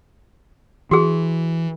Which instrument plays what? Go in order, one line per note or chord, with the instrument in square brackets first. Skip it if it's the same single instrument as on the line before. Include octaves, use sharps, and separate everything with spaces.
[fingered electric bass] E3 [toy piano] F#4 G#4